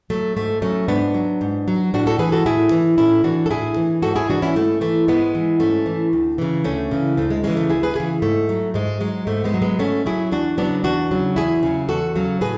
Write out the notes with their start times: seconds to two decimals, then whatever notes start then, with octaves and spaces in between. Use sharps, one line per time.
0.10 F#3 A3
0.36 G#2 A3
0.62 F#3 A3 C#4
0.88 G#2 B3 D4
1.14 F#3
1.41 G#2
1.68 F#3
1.94 A2 D4 F#4
2.07 F#4 A4
2.19 E3 G#4 B4
2.32 F#4 A4
2.46 A2 E4 G#4
2.71 E3
2.98 A2 C#4 E4
3.24 E3 D4 F#4
3.46 A4
3.50 A2 E4 G#4
3.77 E3
4.02 G#2 F#4 A4
4.16 E4 G#4
4.29 E3 D4 F#4
4.42 C#4 E4
4.56 G#2 A3
4.81 E3 A3
5.08 G#2 G#3 B3
5.35 E3
5.60 G#2 A3 C#4
5.86 E3
6.13 D2
6.38 C#3 E3
6.64 D2 A3 C#4
6.91 C#3 E3
7.17 D2 A3
7.30 G#3
7.44 C#3 E3 G#3
7.57 A3
7.69 D2 E4 G#4
7.83 G#4 B4
7.96 C#3 E3 E4 G#4
8.22 G#2 A3
8.49 F#3
8.74 G#2 G#3
9.01 F#3 G#3
9.27 G#2 A3
9.44 G#3 B3
9.54 F#3
9.62 G#3 B3
9.79 G#2 A3 C#4
10.06 F#3 E4 G#4
10.32 E2 D4 F#4
10.58 C#3 F#3 B3 D4
10.84 E2 D4 F#4
11.11 C#3 F#3
11.36 E2 E4 G#4
11.63 C#3 F#3
11.89 E2 F#4 A4
12.16 C#3 F#3
12.41 A2 G#4 B4